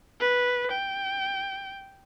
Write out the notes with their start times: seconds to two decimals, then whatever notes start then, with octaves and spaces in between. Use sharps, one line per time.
0.20 B4
0.71 G5